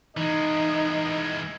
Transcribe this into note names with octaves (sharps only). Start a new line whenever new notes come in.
E3 G#3 D#4